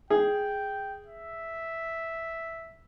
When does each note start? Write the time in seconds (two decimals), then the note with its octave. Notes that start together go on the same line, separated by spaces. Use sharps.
0.10 G#4 G5
1.06 E5